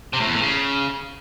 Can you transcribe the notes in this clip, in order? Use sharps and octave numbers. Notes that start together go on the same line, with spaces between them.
C3
A2
E2
A2
C#3